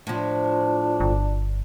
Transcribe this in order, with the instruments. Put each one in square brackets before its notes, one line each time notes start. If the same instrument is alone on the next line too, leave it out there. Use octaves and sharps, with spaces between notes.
[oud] A2 F3 [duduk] D4
[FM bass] G1